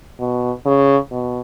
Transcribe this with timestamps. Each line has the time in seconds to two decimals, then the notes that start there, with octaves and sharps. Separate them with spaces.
0.19 B2
0.65 C#3
1.11 B2